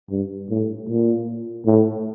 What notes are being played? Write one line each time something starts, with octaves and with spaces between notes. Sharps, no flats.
G2
A2
A#2
A2